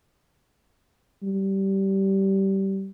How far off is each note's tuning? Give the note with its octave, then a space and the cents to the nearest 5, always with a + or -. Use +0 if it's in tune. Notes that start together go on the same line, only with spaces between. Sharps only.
G3 -20